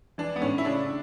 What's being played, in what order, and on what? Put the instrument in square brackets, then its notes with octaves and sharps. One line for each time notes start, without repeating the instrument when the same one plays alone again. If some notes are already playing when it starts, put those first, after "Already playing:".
[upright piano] E3 D4
B3
A2 C#4
E4
C#3 D4